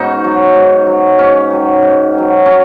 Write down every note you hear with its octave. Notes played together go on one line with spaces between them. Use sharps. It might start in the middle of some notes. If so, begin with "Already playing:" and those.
Already playing: G#2 B3 C#4 D#4 F#4
F#3
G#2
F#3
G#2 C#4
D#3 F#3
G#2
D#3 F#3
C#4